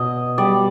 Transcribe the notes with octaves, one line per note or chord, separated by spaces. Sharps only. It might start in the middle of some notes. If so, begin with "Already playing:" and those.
Already playing: B2 D#5
G3 D5